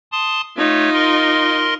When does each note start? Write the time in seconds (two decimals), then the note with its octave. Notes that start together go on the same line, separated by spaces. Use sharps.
0.12 A5 C6 D#6
0.58 A3 D#4 F4 C#5
0.94 A#4 D#5 C6